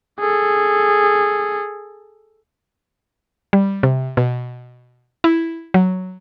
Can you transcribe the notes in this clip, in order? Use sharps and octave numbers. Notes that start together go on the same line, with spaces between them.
G#4 A4
G3
C3
B2
E4
F#3